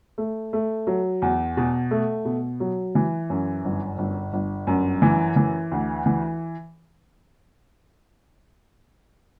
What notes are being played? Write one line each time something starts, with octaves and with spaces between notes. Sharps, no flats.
A3
A3
F#3
E2
B2
A3
B2
F#3
E3
F#2
G1
G1
G1
F#2
E3
E3
D2
E3